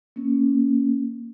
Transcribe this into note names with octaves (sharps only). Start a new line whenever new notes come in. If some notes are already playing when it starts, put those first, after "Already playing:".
A#3 C#4